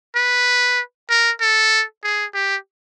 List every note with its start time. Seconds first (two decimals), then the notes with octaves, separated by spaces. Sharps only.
0.15 B4
1.09 A#4
1.40 A4
2.04 G#4
2.34 G4